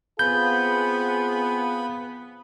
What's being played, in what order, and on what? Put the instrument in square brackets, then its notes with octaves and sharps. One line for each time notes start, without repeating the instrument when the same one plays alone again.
[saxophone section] B3 [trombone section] C4 F4 G#4 [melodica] B5 [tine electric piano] G6